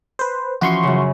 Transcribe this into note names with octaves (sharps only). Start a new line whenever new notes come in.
B4 C5
E3 F3 C#4 F#4 C6 C#6
F#2 C#3